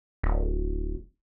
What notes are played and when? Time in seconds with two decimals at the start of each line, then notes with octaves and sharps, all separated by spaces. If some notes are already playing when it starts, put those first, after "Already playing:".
0.23 D1